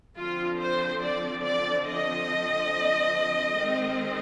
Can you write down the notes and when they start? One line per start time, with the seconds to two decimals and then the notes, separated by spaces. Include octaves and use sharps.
0.18 D3 F3 C4 F4
0.60 C5
1.02 D5
1.44 D5
1.86 D#5
3.55 D#3 G#3 C4